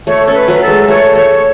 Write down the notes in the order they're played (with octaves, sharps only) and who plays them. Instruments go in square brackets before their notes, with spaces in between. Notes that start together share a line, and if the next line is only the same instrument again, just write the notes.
[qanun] A3 [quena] C#5
[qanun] C#4 [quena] A4
[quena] B4
[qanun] F#3
[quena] A4
[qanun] G#3
[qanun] A3 [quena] C#5
[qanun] A3 [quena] C#5